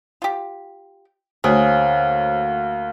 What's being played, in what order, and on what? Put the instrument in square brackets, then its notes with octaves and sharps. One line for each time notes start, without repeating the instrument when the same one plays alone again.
[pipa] F4 G4
[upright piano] D2 [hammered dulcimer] A#3 [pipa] G#4 [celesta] C5 C#5